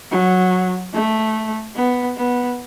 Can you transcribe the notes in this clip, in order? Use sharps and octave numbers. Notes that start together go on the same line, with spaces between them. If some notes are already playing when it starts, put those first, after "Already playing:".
F#3
A3
B3
B3